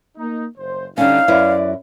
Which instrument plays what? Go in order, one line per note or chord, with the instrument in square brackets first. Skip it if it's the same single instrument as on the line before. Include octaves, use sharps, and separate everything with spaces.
[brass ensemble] A#3 D#4
F#1 C5
[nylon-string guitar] D3 G3 C#4 [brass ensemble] D#4 [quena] F5
[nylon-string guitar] F#2 E4 B4 [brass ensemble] D5